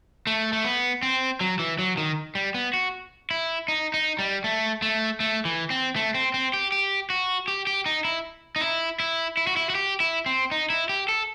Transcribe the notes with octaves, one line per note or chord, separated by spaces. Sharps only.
A3
A3
B3
C4
F#3
E3
F#3
D#3
G3
B3
F#4
E4
D#4
D#4
G3
A3
A3
A3
E3
C4
A3
C4
C4
G4
G4
F#4
G4
G4
D#4
E4
D#4
E4
E4
E4
F#4
E4
F#4
G4
E4
C4
D#4
E4
G4
A4